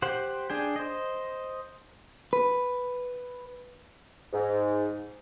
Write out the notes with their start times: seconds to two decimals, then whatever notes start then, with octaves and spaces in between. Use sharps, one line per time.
0.02 G4 C5 F#5
0.50 D4 G#4 G5
0.76 C5 D#5
2.33 B4
4.33 G#2